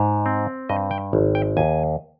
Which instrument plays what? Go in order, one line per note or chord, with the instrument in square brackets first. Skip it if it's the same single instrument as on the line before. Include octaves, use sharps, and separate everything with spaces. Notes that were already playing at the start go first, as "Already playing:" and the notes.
Already playing: [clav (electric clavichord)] G#2
C4
G2 D#5
G5
G#1
G5
D#2 G#5